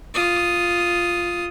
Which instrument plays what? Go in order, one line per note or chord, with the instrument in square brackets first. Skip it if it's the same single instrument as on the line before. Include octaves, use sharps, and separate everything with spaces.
[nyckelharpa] F4 D#6